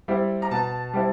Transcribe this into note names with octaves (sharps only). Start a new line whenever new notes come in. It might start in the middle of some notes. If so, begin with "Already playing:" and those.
G3 C4 E4
A#5
B2 A5
G3 C4 E4